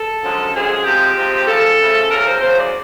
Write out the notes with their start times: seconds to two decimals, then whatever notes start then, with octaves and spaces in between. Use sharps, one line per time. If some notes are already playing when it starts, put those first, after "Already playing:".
Already playing: A4
0.22 F#2 D3 F3 G#3 C#4
0.54 F#2 D3 F3 G#3 C#4 G#4
0.84 C3 F3 G#3 C4 G4
1.17 C3 F3 G#3 C4
1.47 C#3 F3 A3 A4
1.79 C#3 F3 A3
2.10 E2 C#3 F#3 A#4
2.26 C5
2.41 E2 C#3 F#3 C5
2.57 D5